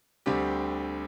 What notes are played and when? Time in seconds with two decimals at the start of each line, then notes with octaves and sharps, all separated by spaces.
0.26 D2 D3 G3 C4 G4